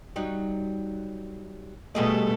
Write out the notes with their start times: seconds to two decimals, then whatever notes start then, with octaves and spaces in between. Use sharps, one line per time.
0.16 F#3 G3 D#4
1.95 B2 G3 A3 G#4 A4 D#5